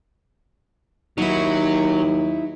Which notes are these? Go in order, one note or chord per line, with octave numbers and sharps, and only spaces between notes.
D#2 F#3 D#4 E4